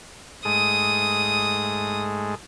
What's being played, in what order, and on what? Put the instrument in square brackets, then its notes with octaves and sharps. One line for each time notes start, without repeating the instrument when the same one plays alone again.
[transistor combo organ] G#2 G#3 A3 [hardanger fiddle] D#6